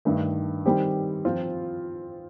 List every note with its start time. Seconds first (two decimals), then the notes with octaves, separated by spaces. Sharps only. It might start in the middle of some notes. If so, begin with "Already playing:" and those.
0.05 G2 D#3 A3
0.66 D#3 G3 C4 G4
1.25 F3 C4 F4